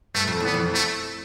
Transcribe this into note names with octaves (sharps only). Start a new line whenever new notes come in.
G2 A3
F2
E2 B3
F2
A3